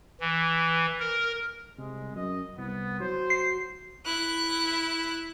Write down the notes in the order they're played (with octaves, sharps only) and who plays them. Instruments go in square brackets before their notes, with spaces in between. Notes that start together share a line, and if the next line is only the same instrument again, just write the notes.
[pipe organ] E3
A#4
[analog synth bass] C2 [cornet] G#3
[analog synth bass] F#2 [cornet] D#5
[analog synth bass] C2 [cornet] B3
[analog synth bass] F#3 [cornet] C5
[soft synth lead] C7
[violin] E4 F#6